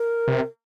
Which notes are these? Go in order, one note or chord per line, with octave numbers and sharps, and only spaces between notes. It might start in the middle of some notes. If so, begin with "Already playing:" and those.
Already playing: A#4
C3